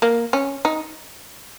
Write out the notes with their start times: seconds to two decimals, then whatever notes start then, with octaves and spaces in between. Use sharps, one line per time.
0.02 A#3
0.33 C#4
0.65 D#4